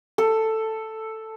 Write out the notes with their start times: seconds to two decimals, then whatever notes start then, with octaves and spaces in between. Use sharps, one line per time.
0.18 A4